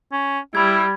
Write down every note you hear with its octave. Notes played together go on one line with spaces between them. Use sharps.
C#4
G3 E4 B5 G#6